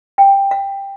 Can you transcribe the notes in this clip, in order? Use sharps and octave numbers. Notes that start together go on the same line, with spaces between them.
G5
F5